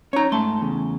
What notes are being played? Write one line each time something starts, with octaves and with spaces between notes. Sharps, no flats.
C#4 D#4 C#5 A#5
G#2 A3 A5 C6
E2 C#3